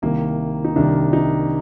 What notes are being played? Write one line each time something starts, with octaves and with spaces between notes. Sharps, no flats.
C2 C3 D#3 A#3
D#4
C2 C3 D#3 D4
D#4